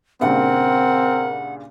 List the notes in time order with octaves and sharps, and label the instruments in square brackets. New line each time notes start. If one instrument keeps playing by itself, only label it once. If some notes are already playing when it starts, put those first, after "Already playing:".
[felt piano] G2 A#2 C#3 [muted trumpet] C4 [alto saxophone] A#4 [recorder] F#5